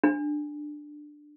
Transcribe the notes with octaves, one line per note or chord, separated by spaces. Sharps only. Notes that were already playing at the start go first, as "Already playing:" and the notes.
D4